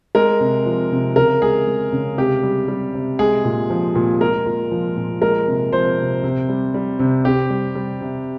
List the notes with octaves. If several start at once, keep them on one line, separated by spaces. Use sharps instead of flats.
G#3 A#4
C3
F3
C3
C#3 A#4
G#3 G#4
G#3
C#3
C3 G4
G3
G3
C3
G#3 G#4
A#2
F3
A#2
G#3 A#4
A#2
F3
A#2
G#3 A#4
C3
F3 C5
C3
C3
G3
G3
C3
C3 G4
G3
G3
C3